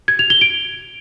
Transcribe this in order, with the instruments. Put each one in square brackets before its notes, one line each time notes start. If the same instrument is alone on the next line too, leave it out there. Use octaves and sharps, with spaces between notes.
[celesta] G#6
F7
G7
D7